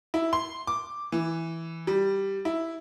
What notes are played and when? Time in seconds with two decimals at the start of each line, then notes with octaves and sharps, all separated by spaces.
0.14 E4
0.33 C6
0.67 D6
1.12 E3
1.87 G3
2.45 E4